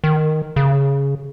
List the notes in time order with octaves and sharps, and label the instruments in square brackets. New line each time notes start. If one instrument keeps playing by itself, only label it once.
[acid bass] D#3
C#3